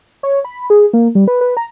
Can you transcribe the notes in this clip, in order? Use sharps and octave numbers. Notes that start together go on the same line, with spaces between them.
C#5
B5
G#4
A#3
G3
B4
B4
A#5